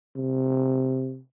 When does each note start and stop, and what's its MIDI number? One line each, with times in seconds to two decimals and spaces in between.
0.16 1.20 48